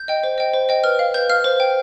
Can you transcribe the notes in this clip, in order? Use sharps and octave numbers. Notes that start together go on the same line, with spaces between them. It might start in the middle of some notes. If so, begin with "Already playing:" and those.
Already playing: G6
D#5 G5
C5
D#5 G5
C5
D#5 G5
B4 F6
F5
B4 G6
F5 F6
C5
G5